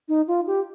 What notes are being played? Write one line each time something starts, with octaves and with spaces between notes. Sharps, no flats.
D#4
F4
G4